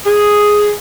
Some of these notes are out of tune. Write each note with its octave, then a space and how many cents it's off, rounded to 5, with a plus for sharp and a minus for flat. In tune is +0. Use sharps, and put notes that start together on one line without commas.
G#4 +0